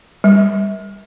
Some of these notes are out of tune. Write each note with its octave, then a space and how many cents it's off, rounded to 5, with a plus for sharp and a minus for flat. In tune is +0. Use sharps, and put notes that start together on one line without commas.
G3 +25